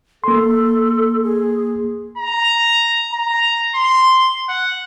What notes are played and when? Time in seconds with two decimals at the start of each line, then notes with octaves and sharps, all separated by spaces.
0.24 A#3 A4 C6
1.24 G#4
2.18 A#5
3.13 A#5
3.75 C6
4.49 F#5